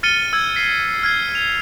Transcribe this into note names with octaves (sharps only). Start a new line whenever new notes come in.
F6 A6 C#7 D#7 G7
E6 G#6
B6 C7
F6 G#6 C7
F7